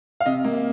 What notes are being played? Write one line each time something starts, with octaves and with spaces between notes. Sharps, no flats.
F5
C3 D#5
A#3